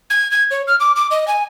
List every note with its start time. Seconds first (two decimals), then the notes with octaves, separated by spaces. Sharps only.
0.10 G#6
0.31 G#6
0.51 C#5
0.67 F6
0.80 D6
0.96 D6
1.11 D#5
1.28 G#5